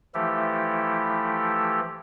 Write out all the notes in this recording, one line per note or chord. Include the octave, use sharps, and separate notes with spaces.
E3 F3 A3 E4 G4 A4